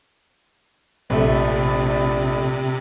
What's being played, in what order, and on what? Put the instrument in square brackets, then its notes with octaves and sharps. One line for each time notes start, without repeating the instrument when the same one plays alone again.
[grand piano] A#1 A3 E5 [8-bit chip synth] C3 [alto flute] D5